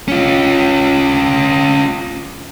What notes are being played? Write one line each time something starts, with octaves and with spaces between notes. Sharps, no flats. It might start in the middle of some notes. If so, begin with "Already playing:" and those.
C#4 F4